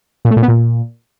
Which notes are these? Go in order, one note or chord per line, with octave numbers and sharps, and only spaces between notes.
A#2
A3
A#2
B3
A#2